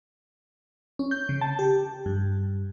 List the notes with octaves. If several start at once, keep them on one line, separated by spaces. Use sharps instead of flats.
C#4
G6
C#3
A5
G4
G2